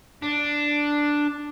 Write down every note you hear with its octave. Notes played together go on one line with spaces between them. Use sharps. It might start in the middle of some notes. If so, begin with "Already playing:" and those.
D4